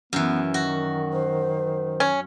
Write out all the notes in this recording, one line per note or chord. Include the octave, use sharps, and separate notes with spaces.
F#2 E3 B3
D#3 F#4
C5
C#4